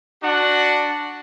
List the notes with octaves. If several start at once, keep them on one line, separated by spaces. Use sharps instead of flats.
D4 F#4 F#5